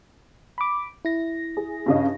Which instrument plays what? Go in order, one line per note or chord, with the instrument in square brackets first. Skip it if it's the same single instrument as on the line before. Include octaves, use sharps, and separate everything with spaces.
[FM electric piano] B5 D6
E4 A#6
[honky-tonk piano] G#4
G2 C#3 D#5